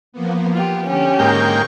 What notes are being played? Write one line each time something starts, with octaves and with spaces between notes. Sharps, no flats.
F3 A#3 B3
B3 F4 G4
D3 C#4 G4
G#2 A#3 G5 C#6